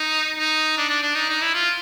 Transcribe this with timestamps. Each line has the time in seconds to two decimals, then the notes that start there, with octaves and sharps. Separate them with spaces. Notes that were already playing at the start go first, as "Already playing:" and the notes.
Already playing: D#4
0.39 D#4
0.78 D4
0.90 D4
1.03 D4
1.15 D#4
1.29 D#4
1.41 E4
1.54 F4